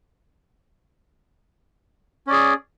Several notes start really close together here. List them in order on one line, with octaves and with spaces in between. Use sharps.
C#4 D5 G#4